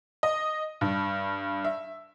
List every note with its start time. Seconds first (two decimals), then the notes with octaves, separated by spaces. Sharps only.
0.23 D#5
0.81 G2
1.64 E5